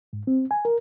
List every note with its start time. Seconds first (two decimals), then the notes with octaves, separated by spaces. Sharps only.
0.13 G#2
0.27 C4
0.51 G#5
0.65 A#4